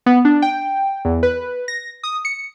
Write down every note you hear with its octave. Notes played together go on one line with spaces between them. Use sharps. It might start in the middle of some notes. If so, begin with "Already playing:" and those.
B3
D4
G5
E2
B4
A#6
D#6
C#7